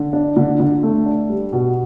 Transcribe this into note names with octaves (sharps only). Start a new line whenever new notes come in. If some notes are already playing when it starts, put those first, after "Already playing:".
Already playing: D3
D4
D3
D3
A3
D4
G3
B2